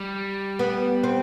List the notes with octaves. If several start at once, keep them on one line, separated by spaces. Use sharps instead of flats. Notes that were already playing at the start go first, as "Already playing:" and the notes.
Already playing: G3
B3
C4